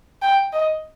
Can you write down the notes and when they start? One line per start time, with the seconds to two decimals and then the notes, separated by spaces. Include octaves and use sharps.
0.22 G5
0.53 D#5